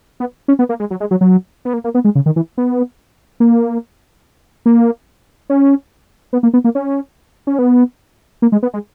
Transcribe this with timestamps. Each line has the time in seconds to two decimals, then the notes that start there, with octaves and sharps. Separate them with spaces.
0.20 B3
0.48 C#4
0.59 B3
0.69 A#3
0.80 G#3
0.91 F#3
1.00 G#3
1.11 F#3
1.21 F#3
1.65 B3
1.74 A#3
1.84 A#3
1.95 B3
2.05 G#3
2.15 C#3
2.26 D#3
2.36 E3
2.57 B3
3.40 A#3
4.66 A#3
5.50 C#4
6.33 B3
6.43 A#3
6.54 B3
6.64 A#3
6.75 C#4
7.47 C#4
7.59 B3
8.42 A#3
8.52 G#3
8.63 B3
8.74 G#3